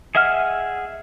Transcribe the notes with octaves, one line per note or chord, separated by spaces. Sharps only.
G#4 D#5 E5 F#5 F6